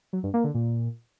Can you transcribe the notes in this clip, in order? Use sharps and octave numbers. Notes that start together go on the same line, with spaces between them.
F#3
G2
A#3
D3
A#2